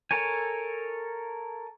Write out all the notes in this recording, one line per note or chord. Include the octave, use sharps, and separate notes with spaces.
A4 A#4 C#5 G#5